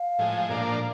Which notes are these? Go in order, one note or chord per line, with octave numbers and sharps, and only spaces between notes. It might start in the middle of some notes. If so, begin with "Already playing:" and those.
Already playing: F5
A2 F3 G#3
A#2 F3 A#3 D4